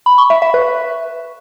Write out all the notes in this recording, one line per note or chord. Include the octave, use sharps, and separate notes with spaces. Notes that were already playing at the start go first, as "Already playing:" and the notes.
B5
C#6
E5
E5
B4